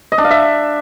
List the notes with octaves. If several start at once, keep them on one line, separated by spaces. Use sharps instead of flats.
D#5
D4
F5
E5